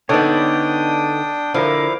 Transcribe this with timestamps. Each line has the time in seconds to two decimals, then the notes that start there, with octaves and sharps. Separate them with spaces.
0.09 D3 B3 D4 D#4 A4 C#5 G5 D#6
1.54 D3 F3 E4 A#4 F5 D6